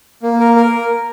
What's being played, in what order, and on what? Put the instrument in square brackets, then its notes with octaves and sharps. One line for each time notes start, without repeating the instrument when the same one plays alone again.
[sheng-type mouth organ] A#3
A#4
A#4